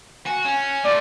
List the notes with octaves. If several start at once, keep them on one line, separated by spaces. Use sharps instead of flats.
F#4 G#5
C#4
A3 F4 D5